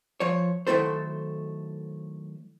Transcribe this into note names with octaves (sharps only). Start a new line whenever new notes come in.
F3 C#5
D#3 F#3 A3 E4 A4 C5